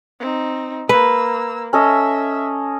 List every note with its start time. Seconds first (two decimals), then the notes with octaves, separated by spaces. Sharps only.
0.20 C4 D#4
0.89 A#3 B4 E6
1.73 C#4 A4 D#5 E5